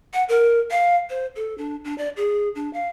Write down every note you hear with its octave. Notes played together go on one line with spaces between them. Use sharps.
F#5
A#4
F5
C5
A4
D4
D4
D5
G#4
D4
F5